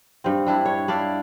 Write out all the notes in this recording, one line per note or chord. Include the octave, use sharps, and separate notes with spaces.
G2 C4
G3 D4 E4
C#5
D4 E4 D5 F5